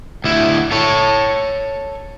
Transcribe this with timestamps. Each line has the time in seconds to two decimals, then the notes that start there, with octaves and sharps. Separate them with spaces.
0.24 D2 E4
0.72 A4 C#5